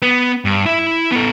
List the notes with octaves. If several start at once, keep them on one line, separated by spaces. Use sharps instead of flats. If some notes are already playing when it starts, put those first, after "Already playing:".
B3
G2
E4 E5
B3 A4